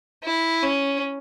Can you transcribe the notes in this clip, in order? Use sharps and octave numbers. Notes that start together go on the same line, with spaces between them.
E4
C#4